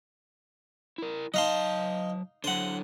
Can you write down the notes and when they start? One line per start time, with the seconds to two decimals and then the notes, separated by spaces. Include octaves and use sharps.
0.98 E4 A#4
1.34 F#3 D#4 F5 A5 C6
2.44 D3 F#3 C5 F#5